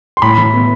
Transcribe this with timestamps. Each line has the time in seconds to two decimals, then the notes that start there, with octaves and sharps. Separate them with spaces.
0.17 C6
0.22 A2 B5
0.38 E3
0.53 B3